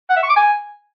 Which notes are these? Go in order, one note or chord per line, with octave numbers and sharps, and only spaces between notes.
F#5
E5
C#6
D6
G#5